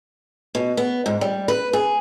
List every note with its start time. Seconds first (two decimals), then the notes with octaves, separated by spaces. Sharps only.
0.55 B2
0.77 B3
1.06 G#2
1.21 G3
1.48 B4
1.73 G#4